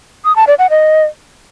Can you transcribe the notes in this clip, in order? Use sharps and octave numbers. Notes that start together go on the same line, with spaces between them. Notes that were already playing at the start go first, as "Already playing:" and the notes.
D#6
A5
D5
F#5
D#5